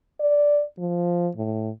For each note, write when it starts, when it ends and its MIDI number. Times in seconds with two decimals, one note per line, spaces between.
0.20 0.63 74
0.78 1.29 53
1.36 1.70 45